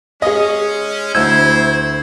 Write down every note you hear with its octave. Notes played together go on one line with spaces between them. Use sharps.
G#3 C#4 G#4 D#5
D2 E4 C5 E6 G6 G#6